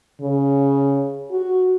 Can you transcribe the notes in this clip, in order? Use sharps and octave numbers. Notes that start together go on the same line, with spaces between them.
C#3
F#4